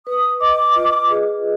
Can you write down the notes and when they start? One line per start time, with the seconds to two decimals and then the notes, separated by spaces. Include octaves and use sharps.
0.06 B4 D#6
0.40 D#5 D6
0.76 F4
1.10 G#4